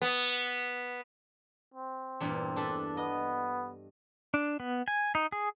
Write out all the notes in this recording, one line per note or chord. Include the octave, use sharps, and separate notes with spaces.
B3
C4
E2 G2 A#2
D4 A4 B4
B3 D#5
D4
B3
G#5
D#4
G#4